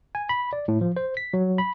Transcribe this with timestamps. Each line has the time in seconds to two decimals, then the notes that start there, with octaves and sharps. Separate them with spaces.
0.15 G#5
0.29 B5
0.53 D5
0.68 A2
0.81 F3
0.97 C5
1.17 B6
1.34 F#3
1.58 B5